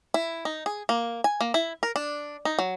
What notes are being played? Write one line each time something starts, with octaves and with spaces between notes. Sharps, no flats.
E4
D#4
G#4
A#3
G#5
A#3
E4
A#4
D4
D#4
F#3